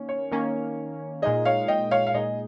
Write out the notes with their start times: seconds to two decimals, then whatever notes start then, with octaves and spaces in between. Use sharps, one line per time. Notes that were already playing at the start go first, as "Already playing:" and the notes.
Already playing: D#3 A#3 C#4
0.09 C#5
0.32 D#3 A#3 C#4
1.22 A#2 G#3 D#4 G#4 D#5
1.45 C#5 F5
1.68 D#5 G5
1.91 C#5 F5
2.07 F5
2.14 A#2 G#3 D#4 G#4 D#5